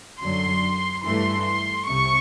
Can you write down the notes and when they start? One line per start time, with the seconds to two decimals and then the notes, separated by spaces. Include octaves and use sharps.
0.22 F#2 D3 F#3 C6
1.05 G2 E3 A3 C6
1.46 C6
1.89 C2 C3 C#6